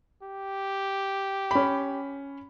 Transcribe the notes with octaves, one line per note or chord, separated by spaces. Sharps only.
G4
C#4 B5